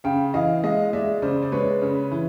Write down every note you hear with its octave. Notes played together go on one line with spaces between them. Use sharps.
C#3 F5 G5
E3 D#5 F5
G#3 D#5 F5
G#3 D5 E5
C#3 C5 D5
D5
G#3 B4 C#5
C#3
E3